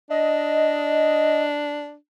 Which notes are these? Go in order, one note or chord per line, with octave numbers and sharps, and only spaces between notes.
D4 D#5